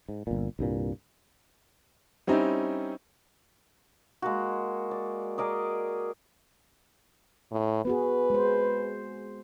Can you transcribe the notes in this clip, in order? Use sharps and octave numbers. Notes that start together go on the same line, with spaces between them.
G#2
G1 A#2
C2 G2 A#2
G3 C4 C#4 D#4 E4
G#3 A#3 F#4
D5
G#4 A#4 D5 D#5
A2
B3 F#4 G#4 B4
G#3 C5